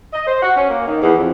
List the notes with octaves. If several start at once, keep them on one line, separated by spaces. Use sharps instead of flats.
D#5
C5
F#4
C#4
A#3
D#3
E2
F2